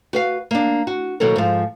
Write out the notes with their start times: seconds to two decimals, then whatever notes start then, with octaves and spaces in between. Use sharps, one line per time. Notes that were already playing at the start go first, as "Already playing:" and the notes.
0.13 F#4 B4 F5
0.51 A#3 D4
0.87 F#4
1.20 B2 D#3 F#3 A#3 A4 A#4
1.36 G#2 F3